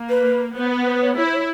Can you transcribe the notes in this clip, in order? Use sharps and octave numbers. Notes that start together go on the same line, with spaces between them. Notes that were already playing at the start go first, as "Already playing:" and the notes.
Already playing: A#3
B4
B3 C5
B4
C5
C#5
E4 C#5
C5
C#5